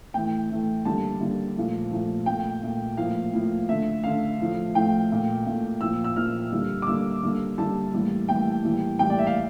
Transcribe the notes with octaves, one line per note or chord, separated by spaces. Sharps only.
A2 E3 A3 G5
A2 E3 A3
D3 G3 A#3 A5
D3 G3 A#3
A#2 F3 A3
A#2 F3 A3
A#2 A3 G5
A#2 A3
A2 F3 A#3 F5
A2 F3 A#3
D3 A3 E5
D3 A3 F5
A2 F3 A3
A2 F3 A3 G5
A#2 A3
A#2 A3
A#2 F3 A#3 E6
E6
A#2 F3 A#3 F6
D3 G3 A#3
D6
D3 G3 A#3 E6
D3 G3 A#3
D3 G3 A#3 A5
A2 E3 G3 A#3
A2 E3 G3 A#3 G5
A2 E3 G3 A#3
A2 E3 G3 A#3 G5
D5
E5
F5